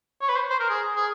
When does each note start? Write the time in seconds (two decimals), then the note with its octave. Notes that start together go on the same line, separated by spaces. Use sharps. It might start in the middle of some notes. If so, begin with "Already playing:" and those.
0.22 C#5
0.29 B4
0.36 C5
0.50 C5
0.60 A#4
0.69 G#4
0.96 G#4